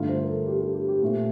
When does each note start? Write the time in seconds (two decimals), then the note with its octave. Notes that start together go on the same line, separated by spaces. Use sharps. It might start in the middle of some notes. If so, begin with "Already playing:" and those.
Already playing: G2 D3 A3 F4
0.09 C5
0.23 A#4
0.28 A4
0.47 G4
0.60 G4
0.74 G4
0.88 G4
1.02 A#2 A3 C4